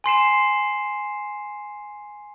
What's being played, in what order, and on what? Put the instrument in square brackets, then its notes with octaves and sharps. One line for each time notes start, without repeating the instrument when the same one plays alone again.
[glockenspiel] G#5 C6 C7 E7